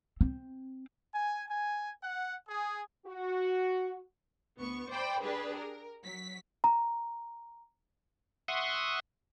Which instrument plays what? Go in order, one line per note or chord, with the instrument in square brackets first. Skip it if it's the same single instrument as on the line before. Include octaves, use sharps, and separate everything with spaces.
[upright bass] C4
[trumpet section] G#5
G#5
F#5
G#4
[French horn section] F#4
[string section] D2 B3 C#6
C5 D5 G5 B5
D4 G4 G#4 B4
A#4
F#3 B6
[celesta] A#5
[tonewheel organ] E5 F#5 C6 C#6 D#6